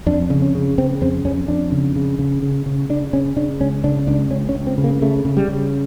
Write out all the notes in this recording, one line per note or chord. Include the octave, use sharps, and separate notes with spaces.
F2 D4
C#3
C#4
C#3
C#3 C4
F2 C4
F2 C#4
F2 D4
C#3
C#3
C#3
C#3
C#3
C#3 D4
C#3 C#4
C#3 D4
C#2 C#4
C#3 D4
C#2 D4
C#2 C#4
C#4
C#2
C4
C#3
A#3
C#3 A3
C#3
G3
C#3